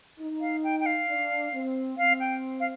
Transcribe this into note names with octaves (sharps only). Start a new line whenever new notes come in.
D#4
F5
G5
G5
F5
D4
C4
C4 F5
G5
F5